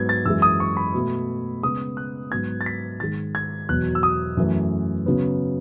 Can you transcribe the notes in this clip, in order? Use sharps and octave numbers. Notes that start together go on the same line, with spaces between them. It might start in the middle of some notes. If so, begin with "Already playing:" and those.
Already playing: G#2 F#3 B3 G#6
A6
F#2 E3 G#3 E6
D#6
C#6
B5
B2 A3
C#3 G#3 B3 D#6
F#6
G#2 F#3 B3 G#6
A6
B6
G#2 D#3 G#3 A6
G#6
E2 B2 F#3 F#6
E6
D#6
F#2 E3 A3
C#3 F#3 B3